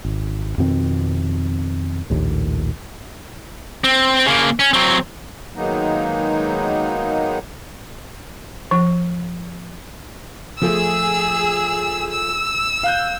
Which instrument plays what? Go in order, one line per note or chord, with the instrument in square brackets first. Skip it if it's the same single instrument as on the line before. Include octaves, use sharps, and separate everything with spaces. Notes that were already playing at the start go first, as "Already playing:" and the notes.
[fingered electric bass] G#1
F2 B2 D#3 C4
A#1 D#2 A2
[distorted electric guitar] C4
C#3 A#3
C#4
F#3 C4
[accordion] D#3 F#3 G#3 A#3 B3 D#4
[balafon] F3
[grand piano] F3 A3 [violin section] G#4 E6
[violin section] E6
[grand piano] F5 F#6 G6